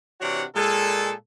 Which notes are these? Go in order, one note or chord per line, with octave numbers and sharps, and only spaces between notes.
C3 E3 D4 F#4 C#5 F#5
A#2 G#3 A4